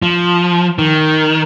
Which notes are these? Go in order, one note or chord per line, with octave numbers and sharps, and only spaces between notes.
F3
D#3